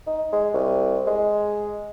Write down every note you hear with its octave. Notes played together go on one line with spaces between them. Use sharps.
D#4
G#3
C2
G#3